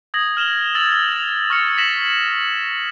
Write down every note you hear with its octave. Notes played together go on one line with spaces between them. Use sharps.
D#6 G#6 A#6 F#7
F6 E7 F7 G7
E6 A6 F7 F#7
F7 F#7
C#6 F6 A6 C#7 F7
A#6 B6 E7 F#7